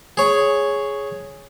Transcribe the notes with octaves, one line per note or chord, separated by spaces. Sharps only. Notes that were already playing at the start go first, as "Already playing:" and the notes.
G#4 C#5